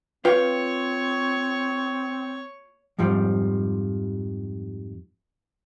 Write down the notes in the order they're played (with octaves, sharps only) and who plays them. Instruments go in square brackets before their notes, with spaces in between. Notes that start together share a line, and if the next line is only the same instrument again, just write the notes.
[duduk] C4 [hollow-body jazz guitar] F4 G5 [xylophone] B4 [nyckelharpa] C#5 C#6
[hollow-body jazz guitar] F2 G#2 F3 G3